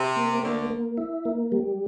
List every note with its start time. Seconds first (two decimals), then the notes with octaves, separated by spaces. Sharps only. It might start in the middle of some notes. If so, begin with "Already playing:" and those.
Already playing: C3
0.16 A#3
0.43 D2 D3 A#3
0.70 A#3
0.97 E4
1.25 A#3
1.52 G3